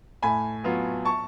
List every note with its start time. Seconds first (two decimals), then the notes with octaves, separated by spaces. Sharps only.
0.22 A2 G#5 B5
0.64 F#3 B3 F4
1.05 A5 C#6